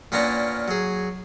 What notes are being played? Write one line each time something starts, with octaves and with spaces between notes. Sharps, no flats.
A#2 A#3 B3 C#4 D4 A#5
F#3 G#4